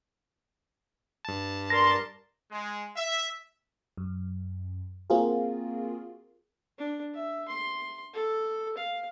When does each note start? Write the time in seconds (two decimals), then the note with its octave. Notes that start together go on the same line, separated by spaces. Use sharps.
1.25 G2 A5
1.70 A#4 D5 C6 A#6
2.51 G#3
2.95 E5
3.97 F#2
5.10 A#3 C4 F4 F#4 G#4 A#4
6.78 D4
7.14 E5
7.48 C6
8.13 A4
8.77 F5